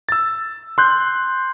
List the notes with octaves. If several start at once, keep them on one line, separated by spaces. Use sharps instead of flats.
E6 A6
C6 F#6 G6